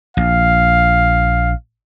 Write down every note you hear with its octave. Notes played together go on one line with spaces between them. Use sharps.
A#1 F5